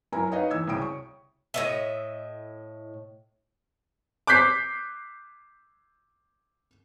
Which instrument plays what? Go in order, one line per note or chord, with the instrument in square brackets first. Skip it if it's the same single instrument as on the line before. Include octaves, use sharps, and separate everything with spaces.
[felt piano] F#2 E4 A#4 G#5 A#5
D#4 B4 C#5 D#5 F5
E2 E6 G#6
C2 C#3 G5 D#6 D7
C#6
[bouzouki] A2 D#5 E5
[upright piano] D6 F#6 G6 B6 C7